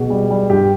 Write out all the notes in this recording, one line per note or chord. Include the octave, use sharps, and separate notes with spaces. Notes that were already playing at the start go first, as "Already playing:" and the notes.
Already playing: B2 G#4
G3
G3
G2 G4